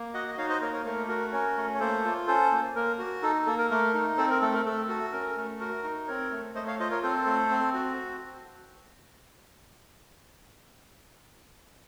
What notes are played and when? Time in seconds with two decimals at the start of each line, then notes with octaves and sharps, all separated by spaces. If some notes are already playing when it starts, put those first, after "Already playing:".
Already playing: A#3
0.14 F#4 D#5 F#5
0.28 D#5
0.38 D#4 C#5 F5
0.49 C5 D#5
0.61 A#3 A#4 C#5
0.73 A#4 C#5
0.85 A3 A#4
1.08 F#4 A#4
1.32 C#4 A#4 C#5
1.57 A3
1.74 C#5
1.80 A#3 A4 C5
2.05 F4
2.27 C#4 A4 C5
2.52 A#3
2.75 A#3 A#4
2.99 F#4
3.22 D#4 A4
3.46 A#3 A4
3.58 A#4
3.70 A3 A#4
3.94 D#4
4.17 C4 A4 C5
4.30 A#4
4.41 A3 A4
4.54 A#4
4.65 A3 A4
4.89 F#4 A4
5.13 C#4 A#4
5.36 A3
5.60 F#4 A#4
5.84 D#4
6.08 C4 A#4 C#5
6.31 A3
6.55 A3 C5 D#5
6.67 C#5 F5
6.80 F4 C5 D#5
6.91 A#4 C#5
7.03 C4 A4 C5
7.26 A3
7.50 C4
7.74 F#4